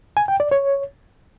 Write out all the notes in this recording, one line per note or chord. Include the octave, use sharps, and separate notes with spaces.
G#5
G5
D5
C#5